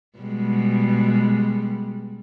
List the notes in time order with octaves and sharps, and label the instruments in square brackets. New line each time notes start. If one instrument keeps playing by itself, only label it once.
[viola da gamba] B2 G3 G#3